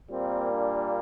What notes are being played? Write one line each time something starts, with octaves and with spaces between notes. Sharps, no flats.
A#2 G3 A#3 C4
D4